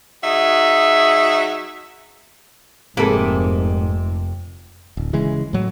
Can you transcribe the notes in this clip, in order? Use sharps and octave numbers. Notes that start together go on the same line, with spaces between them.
F#3 D#4 F#4 G#4 E5
F1 F2 G#2 C3 A#3 G#4 A4 B4
D1
C#3 E3 G#3 C#4
A2 F#3